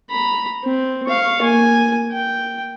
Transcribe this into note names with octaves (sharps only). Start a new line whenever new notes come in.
A#5 B5
C4
F5 C#6
A#3 G#5
G5